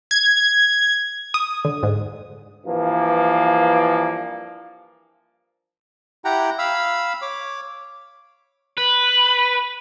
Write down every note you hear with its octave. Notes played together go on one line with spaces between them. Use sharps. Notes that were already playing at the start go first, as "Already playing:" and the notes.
G#6
D#6
D3
G#2
G2 E3 F3 A#3
E4 G4 F#5 G5 A#5
F5 B5 E6
C#5 D6
B4